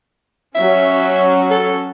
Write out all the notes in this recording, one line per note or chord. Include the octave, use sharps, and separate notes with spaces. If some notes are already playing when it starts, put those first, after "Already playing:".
F#3 C#4 E5
A4